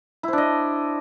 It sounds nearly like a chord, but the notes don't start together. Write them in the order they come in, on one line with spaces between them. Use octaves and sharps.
E4 C5 D4 D#5